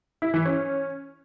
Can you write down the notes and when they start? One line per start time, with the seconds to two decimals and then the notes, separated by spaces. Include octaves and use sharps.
0.22 E4
0.34 E3
0.45 C#4